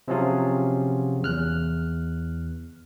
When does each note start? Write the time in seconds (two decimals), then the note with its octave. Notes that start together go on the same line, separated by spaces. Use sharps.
0.08 C3 F3 F#3 C#4 F4 G#4
1.23 E2 F6 F#6